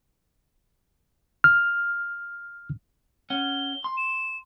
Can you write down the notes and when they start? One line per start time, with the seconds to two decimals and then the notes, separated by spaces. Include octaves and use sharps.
1.44 F6
3.30 C#4 F#5 G7
3.84 C6
3.97 E7